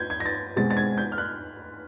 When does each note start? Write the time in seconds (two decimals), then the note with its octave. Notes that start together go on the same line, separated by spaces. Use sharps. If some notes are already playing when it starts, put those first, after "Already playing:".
Already playing: G6 G#6
0.10 G#6
0.20 A#6
0.26 A6
0.56 B2 G#3 C4 A6
0.71 A6
0.77 G#6
0.98 G6
1.12 F6
1.18 F#6